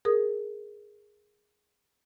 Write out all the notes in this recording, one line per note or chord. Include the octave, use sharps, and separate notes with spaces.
G#4 A#4 D#6